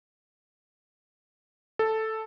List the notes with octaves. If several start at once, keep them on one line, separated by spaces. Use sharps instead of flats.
A4